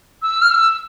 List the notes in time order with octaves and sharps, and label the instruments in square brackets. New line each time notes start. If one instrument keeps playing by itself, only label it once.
[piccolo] E6
F6
E6